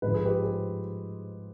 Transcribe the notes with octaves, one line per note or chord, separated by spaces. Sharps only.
G#2 F3 B4
G#4
G4 B4
G#4 C5